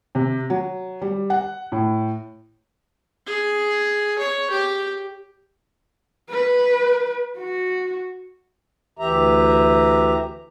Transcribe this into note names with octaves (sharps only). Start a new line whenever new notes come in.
C3
F#3
G3
F#5
A2
G#4
C#5
G4
B4
F#4
D2 E3 G4 E5 A#5